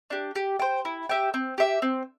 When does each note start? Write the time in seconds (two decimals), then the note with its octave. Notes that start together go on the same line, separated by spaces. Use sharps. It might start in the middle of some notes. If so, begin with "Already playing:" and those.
0.10 D4 G4
0.35 G4
0.59 C5 G5
0.85 E4
1.09 G4 E5 G5
1.34 C4
1.58 G4 E5
1.82 C4